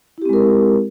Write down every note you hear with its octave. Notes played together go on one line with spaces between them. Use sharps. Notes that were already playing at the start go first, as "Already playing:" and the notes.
G#3 C4 E4 G4 A#4